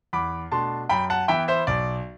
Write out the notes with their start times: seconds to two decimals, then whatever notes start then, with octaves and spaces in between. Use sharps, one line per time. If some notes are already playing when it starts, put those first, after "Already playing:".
0.13 E2 B5 D6
0.52 B2 A3 D4 A5 C6
0.89 F#2 G5 B5
1.10 F#5 A5
1.28 E3 B3 E4 E5 G5
1.48 C5 E5
1.67 B1 D5